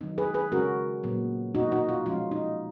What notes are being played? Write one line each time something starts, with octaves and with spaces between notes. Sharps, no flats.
D#3 F#3 B3 D#4
G#4 B4
G#4 B4
C#3 G#3 C#4 F#4 A#4
A#2 F#3 B3
B2 A#3 D#4 F#4
D#4 F#4
F4
F3 G#3 C#4 F4
D#4